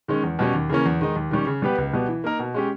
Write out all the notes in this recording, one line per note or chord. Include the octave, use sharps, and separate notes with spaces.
D#3 G#3 C#4
E2
B2 G3 C#4
D#2
C#3 E3 A#3 C#4
E2
D#3 G#3 D#4
D#2
D#3 G3 C#4
C#3
G3 B3 G4 B4
C#2
B2 G3 B3
E3
A#3 D#4 A#4
B2
G#3 C#4 G4